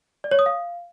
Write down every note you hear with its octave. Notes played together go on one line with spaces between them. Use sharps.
D5
C#5
D#6
F5